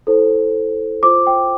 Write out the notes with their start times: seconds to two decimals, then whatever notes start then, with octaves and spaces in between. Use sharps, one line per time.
0.07 E4 A4 C5
1.03 F4 C5 D6
1.27 G5